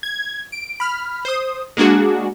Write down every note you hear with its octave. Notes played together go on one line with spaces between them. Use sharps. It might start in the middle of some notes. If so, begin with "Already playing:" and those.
G#6
D7
B5 F6
C5 D#6
G#3 A#3 D4 F#4 G#4